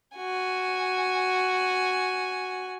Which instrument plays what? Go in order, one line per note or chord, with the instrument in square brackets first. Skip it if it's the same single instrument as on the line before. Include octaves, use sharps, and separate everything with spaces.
[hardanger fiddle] F#4 G#5